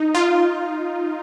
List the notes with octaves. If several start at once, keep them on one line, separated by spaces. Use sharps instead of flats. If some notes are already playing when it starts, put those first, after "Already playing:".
Already playing: D#4
F4